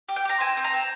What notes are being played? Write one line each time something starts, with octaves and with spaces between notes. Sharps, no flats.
G4
G5
G4 A#5
C4 G#5
C4
A#5
C4